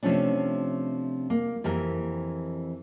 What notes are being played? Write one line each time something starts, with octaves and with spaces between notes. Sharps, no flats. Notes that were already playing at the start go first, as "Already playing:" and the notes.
C3 F3 A3 C#4 D4
A#3
F2 E3 G4 A#4